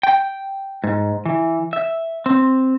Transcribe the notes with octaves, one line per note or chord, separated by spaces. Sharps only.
G5
G#2
E3
E5
C4